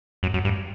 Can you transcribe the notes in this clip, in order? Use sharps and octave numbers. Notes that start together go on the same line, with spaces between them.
F#2
F#2
G2